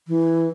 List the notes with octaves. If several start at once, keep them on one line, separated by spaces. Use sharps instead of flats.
E3